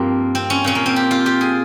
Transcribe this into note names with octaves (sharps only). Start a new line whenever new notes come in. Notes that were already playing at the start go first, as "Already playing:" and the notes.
Already playing: G2 F3 A#3 C4
C4
C#4
A#2 F3 C#4
A#3
C4
G4
F4
G4
G#4